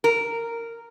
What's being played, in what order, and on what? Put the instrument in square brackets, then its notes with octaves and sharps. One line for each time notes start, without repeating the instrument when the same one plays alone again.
[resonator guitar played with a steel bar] A#4